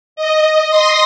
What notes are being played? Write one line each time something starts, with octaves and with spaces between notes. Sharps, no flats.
D#5
C6 D#6 A#6